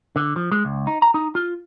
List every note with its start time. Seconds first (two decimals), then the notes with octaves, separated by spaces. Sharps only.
0.16 D3
0.36 F3
0.52 G#3
0.65 C#2
0.87 D#4
1.02 A#5
1.14 D#4
1.35 F4